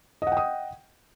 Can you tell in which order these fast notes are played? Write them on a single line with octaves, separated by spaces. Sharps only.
D#5 F#5 G5 D#6